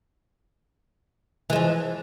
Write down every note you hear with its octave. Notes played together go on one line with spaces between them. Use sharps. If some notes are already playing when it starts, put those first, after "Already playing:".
E3 F3 G#3